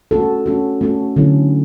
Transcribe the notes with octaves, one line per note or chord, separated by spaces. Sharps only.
A3 C#4 F#4 A4
A3 C#4 F#4 A4
A3 C#4 F#4 A4
D3 F#3 A3 C#4 E4